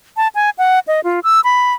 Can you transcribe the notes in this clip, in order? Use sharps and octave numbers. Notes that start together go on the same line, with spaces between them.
A5
G#5
F#5
D#5
F4
E6
B5